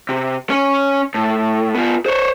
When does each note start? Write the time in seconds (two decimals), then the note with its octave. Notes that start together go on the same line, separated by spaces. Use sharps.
0.09 C3
0.50 C#4 C#5
1.15 A2
1.75 B3 F4
2.06 C5 C#5